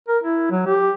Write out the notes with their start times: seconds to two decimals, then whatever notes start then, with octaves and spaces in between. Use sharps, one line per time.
0.08 A#4
0.24 E4
0.51 F#3
0.67 G4